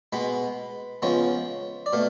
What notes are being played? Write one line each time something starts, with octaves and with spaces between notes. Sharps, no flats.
B2 G#3 B3 B4
C#3 F3 G#3 B3 C#5
D5
B2 A3 F5